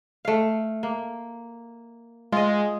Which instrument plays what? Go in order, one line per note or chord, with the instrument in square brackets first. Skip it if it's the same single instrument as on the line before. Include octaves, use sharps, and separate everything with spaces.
[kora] A3 F5
A#3
[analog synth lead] G#3 [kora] F4 D#5